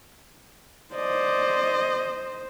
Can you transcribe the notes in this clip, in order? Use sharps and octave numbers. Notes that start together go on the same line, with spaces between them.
C5 D5 D#5